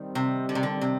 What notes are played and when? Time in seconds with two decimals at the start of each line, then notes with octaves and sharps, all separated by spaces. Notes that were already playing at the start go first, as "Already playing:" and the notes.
Already playing: D#3 G3 C4
0.15 C3
0.49 D3
0.55 C3
0.63 D3
0.81 C3